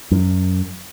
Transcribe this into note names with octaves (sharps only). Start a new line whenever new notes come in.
F#2